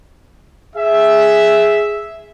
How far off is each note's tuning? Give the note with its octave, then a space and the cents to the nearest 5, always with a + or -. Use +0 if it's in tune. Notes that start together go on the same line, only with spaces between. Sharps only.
G#4 +0 E5 +0